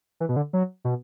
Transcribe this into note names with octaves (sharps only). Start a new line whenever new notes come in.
E3
B2
D3
F#3
B2